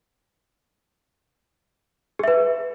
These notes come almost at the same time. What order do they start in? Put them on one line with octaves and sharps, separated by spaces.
G#4 E5 B4